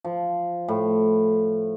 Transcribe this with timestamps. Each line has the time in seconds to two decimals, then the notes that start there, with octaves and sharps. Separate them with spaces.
0.05 F3
0.68 A2